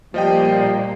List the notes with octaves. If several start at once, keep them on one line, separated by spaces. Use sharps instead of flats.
A#2 F3 G3 A#3 D#5 G5